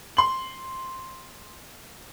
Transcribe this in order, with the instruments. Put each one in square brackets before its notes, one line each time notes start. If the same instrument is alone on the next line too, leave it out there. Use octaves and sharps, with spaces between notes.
[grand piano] C6 F#7